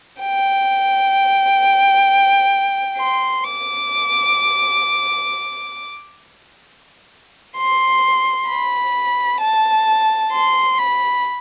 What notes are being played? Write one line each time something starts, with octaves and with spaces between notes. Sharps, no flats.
G5
C6
D6
C6
B5
A5
C6
B5